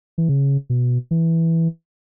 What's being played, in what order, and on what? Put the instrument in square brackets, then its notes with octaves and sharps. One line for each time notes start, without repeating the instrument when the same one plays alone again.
[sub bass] E3
C#3
B2
E3